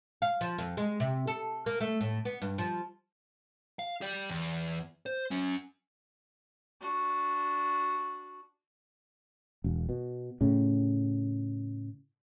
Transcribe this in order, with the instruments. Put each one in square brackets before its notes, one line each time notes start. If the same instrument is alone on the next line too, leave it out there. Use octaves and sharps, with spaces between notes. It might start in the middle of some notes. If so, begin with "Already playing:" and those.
[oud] F5
F3
F2
G#3
C3
A4
A#3
A3
A2
B3
G2
F3
[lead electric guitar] F5
G4 D5
E2
C5
F#3 C#4
[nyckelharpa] D4 F#4
[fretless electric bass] E1
B2
A2 C#3